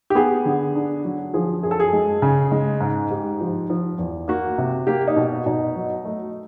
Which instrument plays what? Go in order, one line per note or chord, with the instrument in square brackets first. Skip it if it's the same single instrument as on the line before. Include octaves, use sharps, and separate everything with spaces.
[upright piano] G4
B3 G#4
D3
D4
F#3
F3 G#4
F#2 G#4
A4
G#4
G#3
C#3
G#3
G#2
G#2 G4
F3
F3
E2
A#3 F#4
C3
A#3 G4
D#4
B2
B2 D#4
F#3
A3